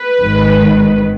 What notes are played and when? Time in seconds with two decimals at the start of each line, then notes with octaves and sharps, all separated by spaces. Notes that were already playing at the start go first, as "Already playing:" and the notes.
Already playing: B4
0.21 G#1 G#2 D#3